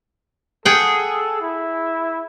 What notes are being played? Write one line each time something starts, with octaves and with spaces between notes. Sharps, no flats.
G#4 A4 F#5 G5
E4